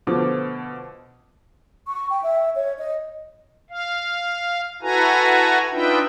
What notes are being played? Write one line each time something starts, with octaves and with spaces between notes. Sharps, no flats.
B2 D3 F3 A3 D6
C#6
G5
E5
C#5
D#5
F5
E4 F#4 A4 B4 G#5 A#5
D4 D#4 F4 B4 E5 G5